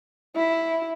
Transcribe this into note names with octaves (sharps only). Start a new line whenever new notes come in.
E4